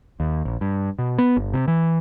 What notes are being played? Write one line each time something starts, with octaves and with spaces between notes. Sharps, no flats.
D#2
A#1
G2
B2
B3
G1
C3
E3